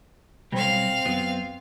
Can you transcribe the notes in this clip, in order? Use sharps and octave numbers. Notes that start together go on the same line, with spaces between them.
B2 F#3 G3 C4 F5
F#2 F#3 B3